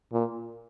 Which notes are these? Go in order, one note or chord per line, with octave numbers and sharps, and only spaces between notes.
A#2